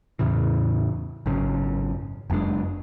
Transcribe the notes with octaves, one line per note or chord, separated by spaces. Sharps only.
E2 A2 C#3 E3
G#1 F#2 C#3
F#1 F#2 G#3 D4